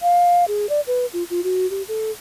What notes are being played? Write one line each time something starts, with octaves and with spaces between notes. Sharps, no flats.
F5
G#4
D5
B4
F4
F4
F#4
G4
A4